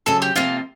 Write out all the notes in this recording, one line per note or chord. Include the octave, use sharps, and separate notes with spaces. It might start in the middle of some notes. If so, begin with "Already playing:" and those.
D2 C#3 F#3 A4
G4
E2 C3 F3 A#3 F4